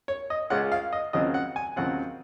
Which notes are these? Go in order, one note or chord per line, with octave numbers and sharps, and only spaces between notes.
C#5
D#5
C#2 C#3 G#3 C#4 F4 F#5
F5
D#5
D#2 C#3 F#3 C4 F4 D#5
F#5
G#5
D#2 C#3 F#3 C4 F4 F#5